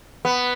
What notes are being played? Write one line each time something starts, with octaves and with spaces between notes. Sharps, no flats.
B3